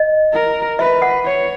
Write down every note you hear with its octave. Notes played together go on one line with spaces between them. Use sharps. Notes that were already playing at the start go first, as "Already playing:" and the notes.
Already playing: D#5
A#4
B4 E5
F#5
C#5